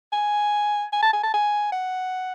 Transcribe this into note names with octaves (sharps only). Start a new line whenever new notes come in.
G#5
G#5
A5
G#5
A5
G#5
F#5